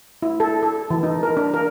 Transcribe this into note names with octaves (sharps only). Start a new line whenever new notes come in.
E4
A4
A4
E3
D#4
A#4
D4
A#4